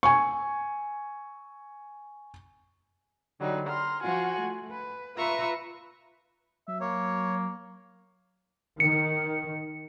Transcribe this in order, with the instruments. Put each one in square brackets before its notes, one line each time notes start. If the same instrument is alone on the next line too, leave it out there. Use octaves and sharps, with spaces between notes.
[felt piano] G#5 C#6
[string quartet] D3 F#3 G3 D#4
A#5 C6 F6
F3 F4 F#4 G#5
A3
B4
F4 B4 E5 A#5 C#6 E6
[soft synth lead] F#3 [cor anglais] E5
[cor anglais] A#3 [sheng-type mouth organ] C#5
[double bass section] D#3 [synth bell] C#7